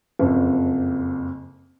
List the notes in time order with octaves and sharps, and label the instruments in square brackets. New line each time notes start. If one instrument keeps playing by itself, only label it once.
[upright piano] F#1 F2